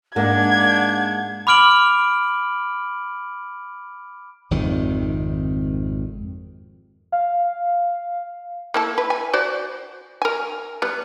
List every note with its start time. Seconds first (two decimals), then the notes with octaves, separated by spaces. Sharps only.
0.16 G#2 A#3 D4 A#4 F#5 G#6
1.47 B5 D6 F6 D7 F#7
4.51 G#1 F2 C3 D#3
7.12 F5
8.74 A#3 E4 A4
8.98 B4
9.10 G#5
9.33 F#4 C5 D5
10.22 A#4 G#5
10.82 G3 B3